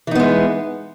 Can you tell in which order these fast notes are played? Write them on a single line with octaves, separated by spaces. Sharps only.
E3 D#4 B3 G#3